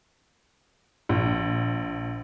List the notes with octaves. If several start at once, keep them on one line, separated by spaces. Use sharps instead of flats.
A#1